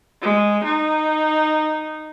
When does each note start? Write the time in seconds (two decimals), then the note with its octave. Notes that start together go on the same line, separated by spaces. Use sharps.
0.21 G#3
0.64 D#4